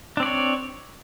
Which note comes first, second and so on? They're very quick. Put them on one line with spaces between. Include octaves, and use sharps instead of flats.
D4 C4 D5 C#5